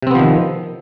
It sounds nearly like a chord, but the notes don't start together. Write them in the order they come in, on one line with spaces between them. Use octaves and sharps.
C3 C4 B3 F3 D#3